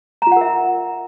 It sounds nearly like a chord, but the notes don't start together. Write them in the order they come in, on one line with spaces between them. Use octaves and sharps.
A#5 F4 F#5 A#4 E5